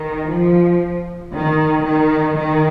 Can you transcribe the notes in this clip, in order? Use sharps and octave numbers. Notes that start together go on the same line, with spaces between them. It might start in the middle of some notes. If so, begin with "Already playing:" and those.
Already playing: D#3
F3
D#3
D#3
D#3